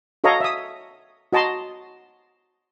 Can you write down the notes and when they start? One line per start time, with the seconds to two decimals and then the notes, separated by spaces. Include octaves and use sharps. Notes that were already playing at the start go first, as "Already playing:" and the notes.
0.24 F#4 A4 C#5 D#5 F5 A#5
0.40 E5 D#6
1.33 F#4 D#5 A5 A#5 C6